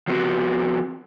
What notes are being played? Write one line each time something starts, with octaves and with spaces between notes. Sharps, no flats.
F3 F#3 B3 C4 F#4 G4